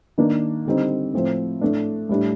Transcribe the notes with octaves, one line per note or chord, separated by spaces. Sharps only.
D#3 A#3 D4
D3 G3 C4 D#4
A2 F3 C4
A2 A3 D4
A2 G3 D4